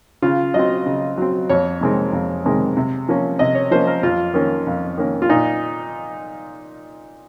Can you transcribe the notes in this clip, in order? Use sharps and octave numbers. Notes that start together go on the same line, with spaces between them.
C#3 F4
F#3 C4 D#5
C#3
F#3 C4
F2 C#5
C3 D#3 G#3 C4
F2
C3 D#3 G#3 C4
C3
F3 A#3 C#4
C3 D#5
C#5
F3 A#3 C#4 C5
A#4
F2 F4
D#3 A#3 C#4
F2
D#3 A#3 C#4
F4
A#2 D#4